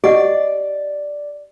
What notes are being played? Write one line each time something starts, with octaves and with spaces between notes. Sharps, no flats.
G4 D5 D#5 F#5